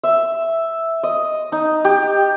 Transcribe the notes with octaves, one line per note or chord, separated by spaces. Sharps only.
E5
D#5
D#4
G4